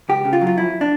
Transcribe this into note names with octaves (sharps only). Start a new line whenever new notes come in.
C#2 G4
C#3
F4
F#3
F4
F2 E4
D4